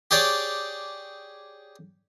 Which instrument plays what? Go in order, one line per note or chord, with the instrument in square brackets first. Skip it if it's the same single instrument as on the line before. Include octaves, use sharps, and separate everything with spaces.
[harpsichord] G4 G#4 C#5 D5